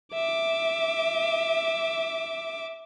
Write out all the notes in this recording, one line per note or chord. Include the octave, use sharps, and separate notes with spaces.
E5 D6